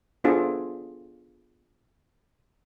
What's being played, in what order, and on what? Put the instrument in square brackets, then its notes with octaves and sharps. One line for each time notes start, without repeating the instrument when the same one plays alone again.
[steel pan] B3 D4 F4 G#4 A4 C5